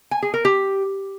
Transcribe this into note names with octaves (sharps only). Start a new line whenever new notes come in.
G#5
G#4
A#4
G4